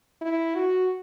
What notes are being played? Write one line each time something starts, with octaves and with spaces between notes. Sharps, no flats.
E4
F#4